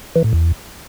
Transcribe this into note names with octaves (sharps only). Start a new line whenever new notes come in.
E3
A2
E2